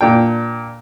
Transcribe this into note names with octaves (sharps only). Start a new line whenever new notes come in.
A#2 D4 G5